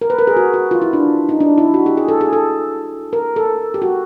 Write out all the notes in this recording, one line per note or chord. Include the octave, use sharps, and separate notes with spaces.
A#4
B4
A#4
G#4
F#4
F#4
F4
E4
D4
D#4
D4
E4
F#4
G4
G#4
A4
G#4
A4
A#4
A4
G4
F#4